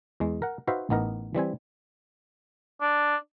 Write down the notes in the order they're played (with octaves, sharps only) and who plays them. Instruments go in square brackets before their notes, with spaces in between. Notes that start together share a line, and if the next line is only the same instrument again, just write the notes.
[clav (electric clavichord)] E2 G#3
A#4 F#5
D#4 F#4 B4 C5 E5 F5
A1 B3 D#4 A#4
E3 G3 C4 G#5
[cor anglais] D4